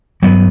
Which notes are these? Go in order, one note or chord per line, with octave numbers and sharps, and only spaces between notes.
G2 F#3 B3